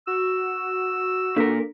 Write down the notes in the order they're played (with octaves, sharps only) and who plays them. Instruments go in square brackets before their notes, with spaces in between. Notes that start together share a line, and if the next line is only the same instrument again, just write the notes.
[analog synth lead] F#4 [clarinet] E6
[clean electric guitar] A#2 A#4 [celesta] D4 A4 B6